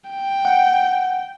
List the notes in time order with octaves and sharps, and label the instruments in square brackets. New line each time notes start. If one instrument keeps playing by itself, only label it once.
[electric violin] G5
[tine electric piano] F#5